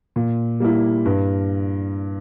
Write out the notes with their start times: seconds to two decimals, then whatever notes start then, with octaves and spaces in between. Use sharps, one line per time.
0.16 A#2
0.60 G3 A#3 E4
1.05 G2